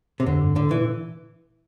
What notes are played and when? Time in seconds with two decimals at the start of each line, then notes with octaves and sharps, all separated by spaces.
0.20 C3
0.26 F2 D3
0.41 G2
0.56 A2 D3
0.71 A#2 E3